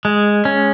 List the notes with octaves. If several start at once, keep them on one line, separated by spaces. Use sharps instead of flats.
G#3
C#4